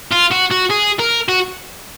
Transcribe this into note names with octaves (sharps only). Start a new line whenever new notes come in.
F4
F#4
F#4
G#4
A#4
F#4